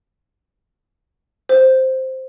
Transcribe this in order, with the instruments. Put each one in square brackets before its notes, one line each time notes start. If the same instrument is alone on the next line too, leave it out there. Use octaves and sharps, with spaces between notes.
[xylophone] C5